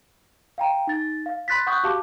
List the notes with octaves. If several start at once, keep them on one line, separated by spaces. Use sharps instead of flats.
F5 G5 A#5
D#4 A6
F5
B5 C6 F#6 A6 B6
F#5 C#6 D#6 F#6 G6
F#4 G4 F5 A5 D6